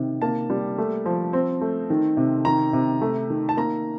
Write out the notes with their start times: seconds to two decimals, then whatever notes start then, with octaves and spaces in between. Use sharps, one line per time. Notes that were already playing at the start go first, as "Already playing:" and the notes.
Already playing: C3 D#3
0.22 A#3 A5
0.50 G3
0.78 A3
1.06 F3
1.33 C4
1.61 A3
1.90 D#3
2.17 C3
2.45 D#3 A#5
2.73 C3
3.01 A3
3.30 D#3
3.49 A5
3.57 A#3 A#5